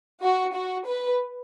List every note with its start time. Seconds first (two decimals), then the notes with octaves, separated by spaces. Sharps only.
0.23 F#4
0.55 F#4
0.87 B4